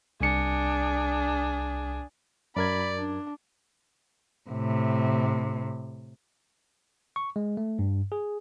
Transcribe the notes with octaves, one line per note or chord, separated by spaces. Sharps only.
C2 D4 G#4 C#7
F#2 A#4 D5 B5 G#6
D4
A2 C3
C#6
G#3
A3
G2
G#4